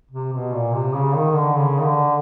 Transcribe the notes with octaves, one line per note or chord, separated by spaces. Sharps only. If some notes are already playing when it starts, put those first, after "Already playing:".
C3
B2
A#2
C3
C#3
D#3
D3
C#3
D#3
D3